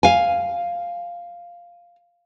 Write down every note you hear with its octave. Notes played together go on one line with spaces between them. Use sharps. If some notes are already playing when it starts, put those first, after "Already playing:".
F5 G#5